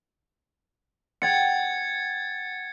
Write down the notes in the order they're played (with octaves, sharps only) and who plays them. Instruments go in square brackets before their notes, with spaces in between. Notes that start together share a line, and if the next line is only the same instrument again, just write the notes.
[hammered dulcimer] F#5 G5 [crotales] G#6 A6 C#7